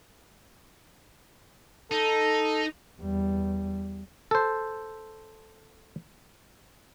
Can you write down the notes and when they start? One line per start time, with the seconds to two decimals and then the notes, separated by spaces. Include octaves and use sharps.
1.91 D#4 A4
3.01 E2 G3
4.31 A4 C5